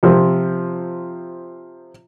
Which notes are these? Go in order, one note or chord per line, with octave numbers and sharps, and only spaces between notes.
C3 F3 C4